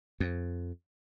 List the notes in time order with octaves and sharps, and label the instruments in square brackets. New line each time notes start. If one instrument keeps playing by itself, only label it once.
[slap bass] F2